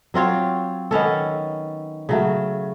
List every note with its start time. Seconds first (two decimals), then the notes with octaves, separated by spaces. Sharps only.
0.14 F#3 C4 F4 C#5
0.91 D#3 B3 C#4 A4
2.09 C#3 F#3 A3